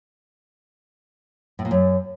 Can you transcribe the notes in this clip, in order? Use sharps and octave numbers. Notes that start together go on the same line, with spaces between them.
A2
A#2
F#2